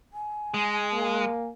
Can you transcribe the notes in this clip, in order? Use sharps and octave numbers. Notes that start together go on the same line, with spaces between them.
G#5
G#3
A#3